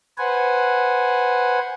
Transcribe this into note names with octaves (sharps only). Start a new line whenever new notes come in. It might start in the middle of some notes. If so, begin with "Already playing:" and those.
B4 C5 F#5 G#5